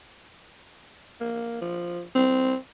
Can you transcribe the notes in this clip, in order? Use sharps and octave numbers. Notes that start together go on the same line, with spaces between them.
A#3
F3
C4